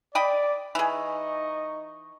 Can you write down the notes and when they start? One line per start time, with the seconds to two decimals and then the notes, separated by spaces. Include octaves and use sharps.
0.15 D5 D#5 G5 B5
0.75 E3 D#4 G#4 D#5 C#6